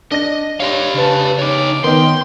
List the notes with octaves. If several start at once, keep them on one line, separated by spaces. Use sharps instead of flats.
D4 D#5 A#6
G4 C#5 F5 C6
C#3 B4 A5
D#4 C#5 D6
D#3 B3 D#4 G5 C6